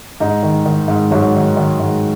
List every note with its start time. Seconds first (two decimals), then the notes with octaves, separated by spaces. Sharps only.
0.20 G#2 D#4
0.43 D#3
0.66 D#3
0.88 G#2
1.11 G#2 F#3 F#4
1.35 D#3
1.57 D#3
1.80 G#2